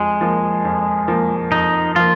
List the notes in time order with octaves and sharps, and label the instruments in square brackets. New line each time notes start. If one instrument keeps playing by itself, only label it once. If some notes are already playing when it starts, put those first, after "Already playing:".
Already playing: [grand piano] F2 [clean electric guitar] G#3
[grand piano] F3 A#3
F2
F3 A#3
[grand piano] F2 [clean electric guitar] D#4
[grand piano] F3 A#3 [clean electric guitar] F4